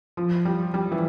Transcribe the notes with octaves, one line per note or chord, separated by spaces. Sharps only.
F3
G3
G3
E3